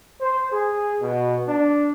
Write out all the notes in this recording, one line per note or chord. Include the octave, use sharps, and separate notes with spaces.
C5
G#4
B2
D4